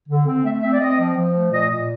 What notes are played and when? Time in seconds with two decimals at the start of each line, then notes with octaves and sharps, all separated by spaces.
0.09 D3
0.27 C4
0.45 A3 E5
0.63 C4 E5
0.72 D5
0.81 C4 D#5
0.99 F3
1.17 F3
1.35 A3
1.52 A#2 D#5
1.71 A#2